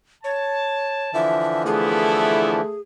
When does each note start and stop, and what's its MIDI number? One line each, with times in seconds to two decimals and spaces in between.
0.24 1.11 73
0.24 1.20 81
1.14 2.61 50
1.14 2.61 52
1.14 2.61 53
1.14 1.63 76
1.66 2.78 57
1.66 2.62 59
1.66 2.62 64
1.66 2.81 68